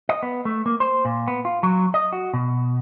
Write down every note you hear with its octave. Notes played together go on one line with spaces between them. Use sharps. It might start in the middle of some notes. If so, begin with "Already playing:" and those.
D#5
B3
A3
A#3
C5
A#2
B3
F4
F#3
D#5
F#4
B2